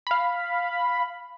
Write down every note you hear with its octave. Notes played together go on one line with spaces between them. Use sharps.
F5 B5